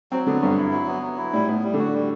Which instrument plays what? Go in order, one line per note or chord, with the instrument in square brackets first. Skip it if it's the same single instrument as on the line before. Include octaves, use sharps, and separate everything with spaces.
[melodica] F#3 [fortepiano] C4
[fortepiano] D3 [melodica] B3
[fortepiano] G2 [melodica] F#3
[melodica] E4
F#3
B3
F#3
E4
[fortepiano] A2 [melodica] G3
[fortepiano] A2 [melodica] B3
[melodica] G3
[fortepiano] D3
[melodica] F#4
G3